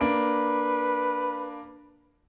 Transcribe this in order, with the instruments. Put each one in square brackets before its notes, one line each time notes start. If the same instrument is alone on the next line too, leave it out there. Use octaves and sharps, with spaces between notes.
[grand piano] A#3 D4 D7 [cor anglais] B4